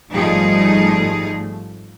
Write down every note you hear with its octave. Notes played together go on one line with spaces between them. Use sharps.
G#1 F3 G3 A3 D#4 G#4